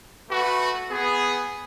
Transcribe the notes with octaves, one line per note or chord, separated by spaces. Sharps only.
A3 F#4 B4
B3 G#4